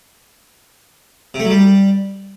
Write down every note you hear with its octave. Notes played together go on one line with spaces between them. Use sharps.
C3
A3
F#3
G3